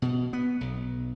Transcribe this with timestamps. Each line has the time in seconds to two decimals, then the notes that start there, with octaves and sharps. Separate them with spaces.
0.02 B2
0.33 B3
0.61 B1